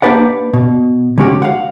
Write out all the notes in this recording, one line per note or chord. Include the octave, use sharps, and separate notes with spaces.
A#3 D4 G4 B4 D5 F#5
B2
D3 G#3 C#4 F#4 G4
F5 F#5